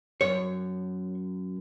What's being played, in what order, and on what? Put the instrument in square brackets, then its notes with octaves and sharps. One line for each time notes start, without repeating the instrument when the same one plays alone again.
[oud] F#2 [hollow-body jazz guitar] C#5